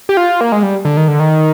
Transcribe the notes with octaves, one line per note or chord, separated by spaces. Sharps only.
G4
F4
A#3
G#3
G3
D3
D#3
D3
D#3